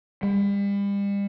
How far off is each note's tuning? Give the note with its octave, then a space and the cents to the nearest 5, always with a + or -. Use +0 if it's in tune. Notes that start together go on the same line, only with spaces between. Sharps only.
G3 +35